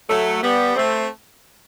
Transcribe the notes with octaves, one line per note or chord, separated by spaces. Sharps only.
F#3 A3
G3 B3
A3 C4